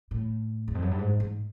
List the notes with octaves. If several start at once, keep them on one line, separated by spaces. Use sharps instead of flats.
A2
E2
F2
F#2
G2
G#2
G#2